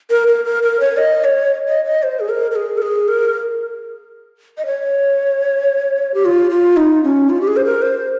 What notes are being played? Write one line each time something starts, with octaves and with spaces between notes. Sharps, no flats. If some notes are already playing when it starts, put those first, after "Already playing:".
A#4
A#4
A#4
A#4
C#5
D#5
C#5
D#5
D#5
C5
G#4
A#4
A#4
G#4
A#4
G#4
A#4
D#5
C#5
G4
F4
F4
D#4
C#4
F4
G4
G#4
C5
A#4
C5